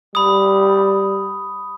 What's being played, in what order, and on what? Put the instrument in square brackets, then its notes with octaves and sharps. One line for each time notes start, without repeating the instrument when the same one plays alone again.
[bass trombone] G3 [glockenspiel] B5 D#6